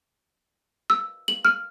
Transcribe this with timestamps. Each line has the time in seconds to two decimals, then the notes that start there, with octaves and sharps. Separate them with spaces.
0.90 E6
1.28 F#7
1.45 F6